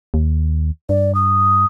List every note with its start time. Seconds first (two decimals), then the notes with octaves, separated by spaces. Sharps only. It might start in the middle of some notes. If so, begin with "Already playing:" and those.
0.14 D#2
0.89 G2 D5
1.15 D#6